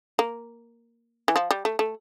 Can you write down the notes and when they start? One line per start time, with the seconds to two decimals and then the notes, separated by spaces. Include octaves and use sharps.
0.19 A#3
1.28 E3
1.36 F3
1.51 G3
1.65 A3
1.79 A3